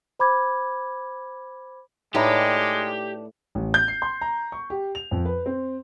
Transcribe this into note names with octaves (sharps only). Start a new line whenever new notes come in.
C5 B5 D6 G#6
A2 G#3 D4 D#4 G4 B4
A1
G6
C7
C6
A#5
C#6
G4
F7
F2
B4
C4